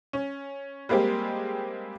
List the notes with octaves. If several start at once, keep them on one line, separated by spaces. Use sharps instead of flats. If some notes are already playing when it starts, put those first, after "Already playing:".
C#4
G3 G#3 A#3 C4 G4